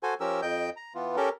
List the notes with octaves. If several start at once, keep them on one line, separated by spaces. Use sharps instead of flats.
F#4 A4 C5 G#5
F3 C#4 G4 A#4 E6
F2 D#5 G5 G6
A#5
E3 B3 F4
C#4 G4 A4 A#4